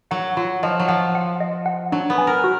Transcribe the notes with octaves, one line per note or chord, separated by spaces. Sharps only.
F#3 F#5
F#3 F4
F3 D#5
F#3
F3 F#5
F#5
D#5
F#5
F#3 D4
B3
G#5
A#4
F#4